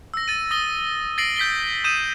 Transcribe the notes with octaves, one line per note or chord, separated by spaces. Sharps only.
E6 A#6
A6 D#7
D#6 A#6 G7
A6 A#6 C7 D7 F#7
G6 B6 D7 G7
D#6 G6 D#7 E7